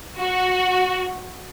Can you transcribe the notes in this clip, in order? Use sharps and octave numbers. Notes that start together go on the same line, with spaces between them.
F#4